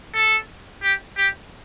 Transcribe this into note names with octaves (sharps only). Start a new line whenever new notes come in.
A4
G4
G4